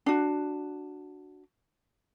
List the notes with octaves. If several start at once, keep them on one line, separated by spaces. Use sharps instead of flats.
D4 F#4